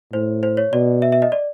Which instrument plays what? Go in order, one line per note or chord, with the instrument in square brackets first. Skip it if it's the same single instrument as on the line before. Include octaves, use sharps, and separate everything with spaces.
[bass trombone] A2 [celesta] C5
[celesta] C5
C#5
[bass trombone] B2 [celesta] D5
[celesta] E5
E5
D#5
D5